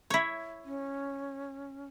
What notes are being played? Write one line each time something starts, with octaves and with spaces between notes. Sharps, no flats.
E4 C#5
C#4